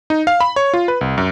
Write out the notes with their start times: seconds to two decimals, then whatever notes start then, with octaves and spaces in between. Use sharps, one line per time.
0.10 D#4
0.27 F5
0.40 B5
0.56 C#5
0.74 F4
0.88 B4
1.01 C2
1.18 F#2